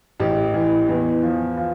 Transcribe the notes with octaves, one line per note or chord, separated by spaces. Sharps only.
A1 G4
E3
E2
F3
F4